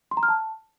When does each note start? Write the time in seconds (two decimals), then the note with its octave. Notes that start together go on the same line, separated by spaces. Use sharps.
0.11 C6
0.17 A#5
0.23 F6
0.28 A5